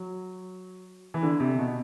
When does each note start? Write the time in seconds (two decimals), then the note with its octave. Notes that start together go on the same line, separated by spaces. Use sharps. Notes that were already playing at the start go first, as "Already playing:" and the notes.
Already playing: F#3
1.14 E3
1.22 D3
1.40 C3
1.58 B2